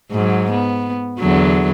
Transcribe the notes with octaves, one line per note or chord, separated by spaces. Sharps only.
G#2 F#3
B3
E2 D3 F#3